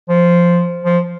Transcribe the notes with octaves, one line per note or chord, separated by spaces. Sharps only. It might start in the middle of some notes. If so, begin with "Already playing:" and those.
F3
F3